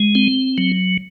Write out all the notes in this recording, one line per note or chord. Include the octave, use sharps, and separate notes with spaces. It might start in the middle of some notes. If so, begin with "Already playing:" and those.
Already playing: G#3
C4
F#3